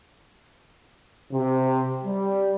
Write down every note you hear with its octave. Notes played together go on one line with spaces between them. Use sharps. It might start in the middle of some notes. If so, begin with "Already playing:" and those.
C3
G3